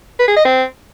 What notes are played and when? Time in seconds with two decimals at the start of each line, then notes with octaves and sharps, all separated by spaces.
0.19 B4
0.28 G#4
0.36 D#5
0.45 C4